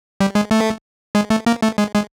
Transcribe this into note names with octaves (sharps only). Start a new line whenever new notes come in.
G3
G#3
A3
G#3
A3
A#3
A3
G#3
G#3